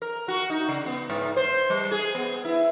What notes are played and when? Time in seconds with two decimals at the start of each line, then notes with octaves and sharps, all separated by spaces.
0.02 A#4
0.28 F#4
0.50 D#4
0.69 C#3
0.86 B3
1.09 G#2
1.37 C5
1.70 G3
1.91 G#4
2.15 B3
2.45 E4